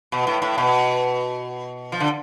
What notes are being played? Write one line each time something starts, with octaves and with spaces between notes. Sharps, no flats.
B2
A2
A2
B2
F3
D3